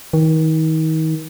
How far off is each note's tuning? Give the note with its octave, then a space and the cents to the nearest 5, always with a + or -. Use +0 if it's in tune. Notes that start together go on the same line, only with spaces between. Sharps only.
D#3 +35